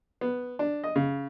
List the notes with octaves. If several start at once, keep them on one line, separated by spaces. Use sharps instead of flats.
B3
D4
D#5
C#3